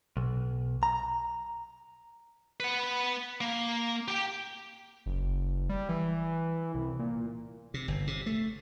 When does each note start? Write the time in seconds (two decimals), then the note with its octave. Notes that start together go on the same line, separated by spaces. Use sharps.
0.17 B1
0.83 A#5
2.60 B4 F#5
3.41 A#3
4.08 G4 G5
5.06 F#1
5.69 G3
5.89 E3
6.74 C2
6.99 A#2
7.74 C3
7.88 G1
8.07 C3
8.26 A3